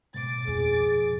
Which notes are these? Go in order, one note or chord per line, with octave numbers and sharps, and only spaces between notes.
G#2 B2 D6 A6
F2 G#4